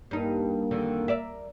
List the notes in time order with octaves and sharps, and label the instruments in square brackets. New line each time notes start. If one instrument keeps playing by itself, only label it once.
[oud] G2 D#4 [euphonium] A#3
[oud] F2 D3 D#3
A#4 D5 E5